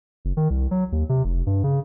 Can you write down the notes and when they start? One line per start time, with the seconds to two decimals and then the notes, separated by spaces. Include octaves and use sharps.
0.25 F#1
0.37 D#3
0.50 C2
0.71 F#3
0.92 D#2
1.09 C3
1.25 F1
1.46 G2
1.64 C#3